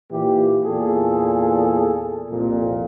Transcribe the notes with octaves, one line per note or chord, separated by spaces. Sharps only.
A#2 E3 G4
E2 A#2 G#4 A4
C2 F2 A#2